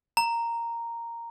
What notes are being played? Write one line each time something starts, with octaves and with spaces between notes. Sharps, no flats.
A#5